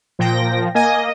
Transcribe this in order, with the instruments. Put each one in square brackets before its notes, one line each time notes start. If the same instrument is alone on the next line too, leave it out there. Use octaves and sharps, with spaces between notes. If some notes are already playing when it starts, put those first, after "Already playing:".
[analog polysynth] A#2 G5 A#6 [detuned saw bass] F3
[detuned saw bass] A#3 [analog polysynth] D#5 [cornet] G#5